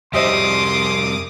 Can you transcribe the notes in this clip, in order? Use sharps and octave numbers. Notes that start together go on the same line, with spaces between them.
F2 G3 C5 D#5 E5 C6 D6 D#6